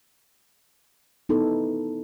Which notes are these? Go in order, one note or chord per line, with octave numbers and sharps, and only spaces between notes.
B3 D#4 E4 A4